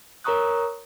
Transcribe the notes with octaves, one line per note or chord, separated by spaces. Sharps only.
A#4 C#5 A#5 C#6 D#6 F#6